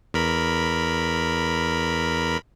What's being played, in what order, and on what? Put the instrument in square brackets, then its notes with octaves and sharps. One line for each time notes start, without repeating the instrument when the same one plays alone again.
[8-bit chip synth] E2 A#4 B5